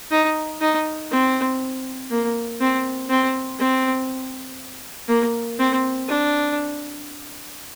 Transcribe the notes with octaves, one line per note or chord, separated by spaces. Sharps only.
D#4
D#4
C4
A#3
C4
C4
C4
A#3
C4
D4